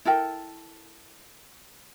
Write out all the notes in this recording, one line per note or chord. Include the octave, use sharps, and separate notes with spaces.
E4 A4 A#4 G5